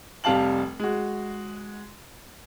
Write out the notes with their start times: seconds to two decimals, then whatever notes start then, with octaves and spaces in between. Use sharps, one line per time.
0.24 F1 C3 G3 F5 A5 F#7
0.80 G#3 F#4